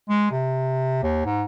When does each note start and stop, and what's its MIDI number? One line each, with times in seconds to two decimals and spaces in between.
0.09 0.27 56
0.31 1.03 48
1.03 1.23 39
1.26 1.43 44